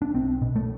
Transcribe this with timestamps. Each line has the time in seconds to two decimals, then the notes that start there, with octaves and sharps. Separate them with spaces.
0.02 D4
0.14 B1 C4
0.42 B2
0.56 A3